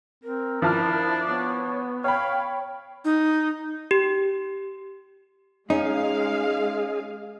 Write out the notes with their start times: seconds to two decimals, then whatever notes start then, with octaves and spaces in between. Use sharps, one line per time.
0.24 C4 A#4
0.62 F3 D4 E4 A5 F6
1.29 B3 C#5
2.04 C#5 F5 G5 B5
3.05 D#4
3.91 G4
5.70 G#3 C#4 D#4 G#4 D#5 F5